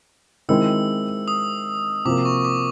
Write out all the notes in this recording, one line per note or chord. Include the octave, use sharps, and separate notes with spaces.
D#3 G#3 C4 E4 E6
D#6
C3 F3 A#3 D6
C#6
D6